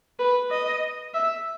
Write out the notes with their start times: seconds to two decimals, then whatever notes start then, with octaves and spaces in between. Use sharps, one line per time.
0.19 B4
0.51 D#5
1.14 E5